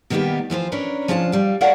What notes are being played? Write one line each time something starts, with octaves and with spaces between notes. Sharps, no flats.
B2 D#3 G3 A#3 B3 G4
E3 F3 F4 C5
C#4 D4 A#4 B4 C#5
F3 C#4 D4 F4 A5
G3 F5
F#4 A#4 C#5 D5 F5 F#5